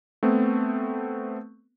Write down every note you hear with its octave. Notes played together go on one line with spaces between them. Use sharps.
A3 B3 C4